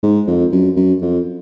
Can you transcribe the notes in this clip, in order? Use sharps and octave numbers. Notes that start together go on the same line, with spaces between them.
G#2
F2
F#2
F#2
F2